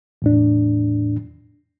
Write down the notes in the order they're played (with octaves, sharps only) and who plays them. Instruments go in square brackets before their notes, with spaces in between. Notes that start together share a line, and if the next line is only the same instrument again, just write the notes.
[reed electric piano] E2 A2 D4